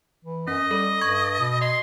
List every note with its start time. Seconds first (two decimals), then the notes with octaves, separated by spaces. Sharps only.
0.25 E3
0.48 F#2 C#4 D#5
0.71 G3 A4
1.01 G2 C#6 G#6
1.39 B2
1.61 D#5 C6